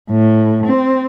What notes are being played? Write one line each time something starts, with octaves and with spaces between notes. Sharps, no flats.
A2
C4